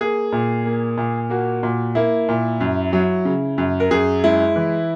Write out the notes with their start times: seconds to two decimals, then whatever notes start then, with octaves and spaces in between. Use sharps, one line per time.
0.01 A#3 G#4
0.32 A#2
0.66 A#3
0.98 A#2
1.30 A#3 F#4
1.63 A#2
1.95 A#3 E4
2.29 A#2
2.60 F#2
2.93 F#3
3.25 C#3
3.58 F#2
3.80 A#4
3.91 F#2 G#4
4.23 G#3 E4
4.56 E3